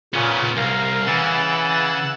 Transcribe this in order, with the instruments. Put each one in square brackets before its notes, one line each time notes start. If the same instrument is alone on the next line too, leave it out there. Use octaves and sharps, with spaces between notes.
[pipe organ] A#2 C#3 [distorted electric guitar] B3 C#4
[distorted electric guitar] C2 [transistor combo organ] A#4 [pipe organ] F5
[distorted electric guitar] C#3 [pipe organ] E3 A6 [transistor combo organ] F#5 E6